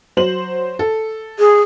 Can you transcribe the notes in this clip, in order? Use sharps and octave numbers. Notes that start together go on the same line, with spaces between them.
F#3 C5 F#7
A4
G#4